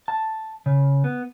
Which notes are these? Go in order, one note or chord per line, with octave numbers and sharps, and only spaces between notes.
A5
C#3
B3